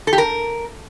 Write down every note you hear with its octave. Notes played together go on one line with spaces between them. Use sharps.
A4
G4
A#4